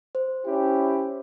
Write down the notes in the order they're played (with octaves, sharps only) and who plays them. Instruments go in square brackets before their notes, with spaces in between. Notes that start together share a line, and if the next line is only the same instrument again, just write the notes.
[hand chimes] C5
[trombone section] C#4 E4 G4